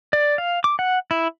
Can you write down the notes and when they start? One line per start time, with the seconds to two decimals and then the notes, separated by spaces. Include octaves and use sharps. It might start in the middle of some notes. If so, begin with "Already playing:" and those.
0.13 D5
0.38 F5
0.64 D6
0.79 F#5
1.11 E4